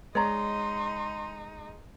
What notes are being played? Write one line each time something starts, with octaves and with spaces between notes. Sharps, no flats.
G#3 D#4 C#5 D5 A#5 C6